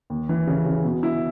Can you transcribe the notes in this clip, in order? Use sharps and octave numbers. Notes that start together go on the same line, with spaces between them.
D#2
E3
C#3
C#3
B2
E4